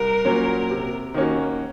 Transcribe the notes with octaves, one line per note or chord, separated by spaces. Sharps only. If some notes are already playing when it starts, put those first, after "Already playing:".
Already playing: C2 A#4
A#2 F#3 C#4
C3
D#3 A#3 C#4 F#4